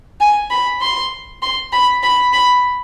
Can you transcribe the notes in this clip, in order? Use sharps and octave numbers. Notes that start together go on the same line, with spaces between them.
G#5
B5
C6
C6
B5
B5
B5